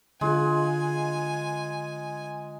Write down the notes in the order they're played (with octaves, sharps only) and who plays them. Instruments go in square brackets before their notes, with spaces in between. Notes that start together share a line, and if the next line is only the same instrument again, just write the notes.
[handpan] D3 F4 [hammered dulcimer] G#3 [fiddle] G#5